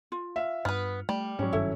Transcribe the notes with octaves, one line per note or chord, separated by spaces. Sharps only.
F4
E5 F5
G2 B3 B4 F6
G3 A3
G#2 F#3 C#4
F#1 G2 D#3 E4 A4 E5